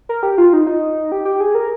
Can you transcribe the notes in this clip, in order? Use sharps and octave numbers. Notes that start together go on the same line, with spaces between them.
A#4
G4
F4
D#4
D#4
G4
G4
G#4
A#4